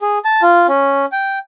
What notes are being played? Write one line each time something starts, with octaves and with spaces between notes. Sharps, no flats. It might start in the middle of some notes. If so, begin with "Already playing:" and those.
G#4
A5
F4
C#4
G5